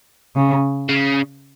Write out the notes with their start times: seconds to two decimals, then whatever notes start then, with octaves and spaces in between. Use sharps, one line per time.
0.36 C#3
0.89 C#3